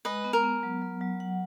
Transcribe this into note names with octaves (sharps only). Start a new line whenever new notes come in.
G#3 B4 D#5
B3
A#4
B3
F#3
F#3
F#3
F#5